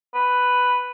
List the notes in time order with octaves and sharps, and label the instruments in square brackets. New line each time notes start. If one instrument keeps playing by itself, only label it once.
[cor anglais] B4